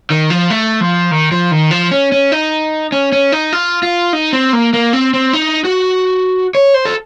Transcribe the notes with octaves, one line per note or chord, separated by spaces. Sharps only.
D#3
F3
A3
F3
D#3
F3
D#3
F3
C#4
C#4
D#4
C#4
C#4
D#4
F4
F4
D#4
C4
A#3
A#3
C4
C4
D#4
F#4
C#5
C5
A4